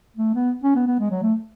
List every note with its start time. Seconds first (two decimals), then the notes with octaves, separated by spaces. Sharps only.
0.17 A3
0.35 B3
0.63 C#4
0.75 B3
0.87 B3
0.99 G#3
1.11 F#3
1.22 A3